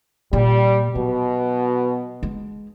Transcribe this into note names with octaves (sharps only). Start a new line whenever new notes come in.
A#2 G3
B2 F#3
G#3